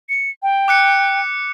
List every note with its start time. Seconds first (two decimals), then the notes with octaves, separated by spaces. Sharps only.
0.09 C#7
0.43 G5
0.68 D6 F#6 C#7